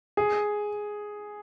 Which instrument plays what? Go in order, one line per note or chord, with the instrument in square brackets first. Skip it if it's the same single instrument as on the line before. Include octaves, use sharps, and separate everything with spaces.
[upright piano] G#4